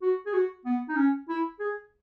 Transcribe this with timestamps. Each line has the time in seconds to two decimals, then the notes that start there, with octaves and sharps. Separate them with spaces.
0.02 F#4
0.26 G#4
0.33 F#4
0.66 B3
0.89 D#4
0.96 C#4
1.29 E4
1.60 G#4